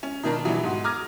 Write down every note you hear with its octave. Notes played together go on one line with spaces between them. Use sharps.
C#4
B2 D#3 D4 A#4
B2 E3 F#3 G3
G#2 F#4
A#5 D6 D#6 F6 G#6 A#6